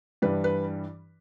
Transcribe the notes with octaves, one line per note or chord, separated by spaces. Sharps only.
G2 E3 G3 B4
B4